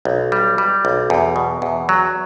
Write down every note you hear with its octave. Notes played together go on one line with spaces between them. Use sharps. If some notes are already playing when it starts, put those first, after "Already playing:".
B1
G3
G3
B1
E2
B2
E2
F#3